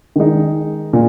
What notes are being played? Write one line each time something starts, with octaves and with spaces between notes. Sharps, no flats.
D#3 G#3 D#4
A#2